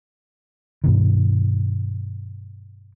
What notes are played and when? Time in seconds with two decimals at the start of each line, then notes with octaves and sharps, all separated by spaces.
0.84 G2 B2 D#3